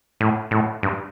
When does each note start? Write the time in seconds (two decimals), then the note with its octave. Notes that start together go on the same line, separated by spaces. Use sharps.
0.21 A2
0.51 A2
0.83 G2